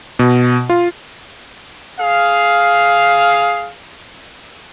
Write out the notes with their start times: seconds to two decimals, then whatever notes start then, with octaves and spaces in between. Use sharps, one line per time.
0.19 B2
0.70 F4
1.99 G#4 F5